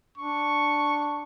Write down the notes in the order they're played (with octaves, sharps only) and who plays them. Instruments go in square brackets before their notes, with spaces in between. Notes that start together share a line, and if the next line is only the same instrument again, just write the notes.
[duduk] D4 [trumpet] C#6